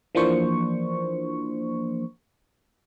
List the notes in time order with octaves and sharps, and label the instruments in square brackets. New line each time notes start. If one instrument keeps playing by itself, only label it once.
[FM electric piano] E3 F3 A#3 D4 C5 C#6